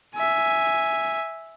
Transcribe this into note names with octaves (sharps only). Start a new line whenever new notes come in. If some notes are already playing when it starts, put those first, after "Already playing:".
E5 G#5